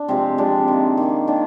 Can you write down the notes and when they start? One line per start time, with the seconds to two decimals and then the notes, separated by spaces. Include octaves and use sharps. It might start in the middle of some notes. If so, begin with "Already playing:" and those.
Already playing: D4
0.08 C3 F3 G#3 C4
0.38 C3 F3 G#3 D4
0.68 D#3 A#3
0.97 D#3 A#3
1.27 D#3 A#3 D4